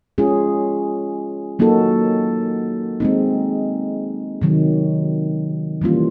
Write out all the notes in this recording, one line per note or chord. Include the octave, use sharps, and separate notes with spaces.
G#3 C#4 F4 G#4
F#3 A#3 D#4 F#4 A4
G#3 C4 D#4
C3 D#3 F#3
E3 G3 A#3 C#4 F4